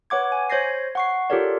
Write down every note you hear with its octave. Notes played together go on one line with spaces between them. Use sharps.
B4 C#5 F#5 D6 G#6
G#5
C5 C#5 G6 G#6 A#6 C7
F#5 C#6 C7
F4 G4 A4 A#4 C#5 D5